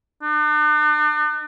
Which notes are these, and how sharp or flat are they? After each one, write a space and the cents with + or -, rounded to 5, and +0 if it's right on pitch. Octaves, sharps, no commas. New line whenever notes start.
D4 +45